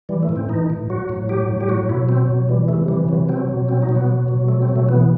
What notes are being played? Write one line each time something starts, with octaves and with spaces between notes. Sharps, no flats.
E3 G3
A3
A2
C4
E3 D#4
A2
F#3 F#4
A2
F#3 G4
A2
G4
F#3 F#4
B2 E4
F#3 C4
B2
E3 G3
C3 A3
E3 G3
C3 F#3
F#3 C4
B2
F#3 C4
D#4
B2
B3
F#3
B2
F#3 A3
C4
B2
A3
E3 B3